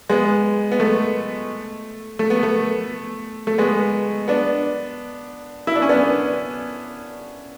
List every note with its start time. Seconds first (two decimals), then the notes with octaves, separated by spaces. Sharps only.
0.10 G#3 B3
0.72 B3
0.80 A3
2.19 A3
2.30 B3
2.43 A3
3.47 A3
3.58 G#3 B3
4.28 B3 D4
5.67 E4
5.76 D4
5.82 C#4
5.89 B3 D4